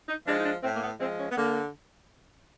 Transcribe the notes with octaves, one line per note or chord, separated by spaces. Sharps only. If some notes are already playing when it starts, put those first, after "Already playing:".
D#4
F3 G#3 D4
D#4
D4
A2 C4
A#3
B3
F3 G#3 C4
C#4
B3
D3 A#3